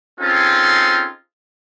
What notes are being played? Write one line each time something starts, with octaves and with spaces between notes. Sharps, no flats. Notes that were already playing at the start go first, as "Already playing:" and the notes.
C4 C#4 D#4 F4 G#4 A4